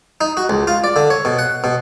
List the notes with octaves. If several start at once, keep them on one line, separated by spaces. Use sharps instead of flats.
D#4
F#4
C#2
F4
D5
D3
C#5
B2
F#5
B2